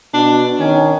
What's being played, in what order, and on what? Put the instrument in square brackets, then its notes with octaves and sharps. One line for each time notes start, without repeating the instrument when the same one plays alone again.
[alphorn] B2 [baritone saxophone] D4
[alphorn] D#3 [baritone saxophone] C#4